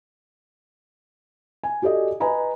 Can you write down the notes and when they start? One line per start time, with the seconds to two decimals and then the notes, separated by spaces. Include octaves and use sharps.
1.63 G#5
1.82 F#4 G4 A4 D5 D#5
2.20 B4 D#5 G#5 A#5 B5